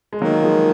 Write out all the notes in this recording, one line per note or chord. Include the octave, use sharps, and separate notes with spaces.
G#3
D#3 F#3 A#3
F3 G#3